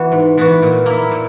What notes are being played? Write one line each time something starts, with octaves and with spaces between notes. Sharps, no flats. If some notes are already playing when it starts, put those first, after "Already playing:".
Already playing: E3 B3 F#4
G#2
E3 B3 F#4
A#2
A#3 E4
A#2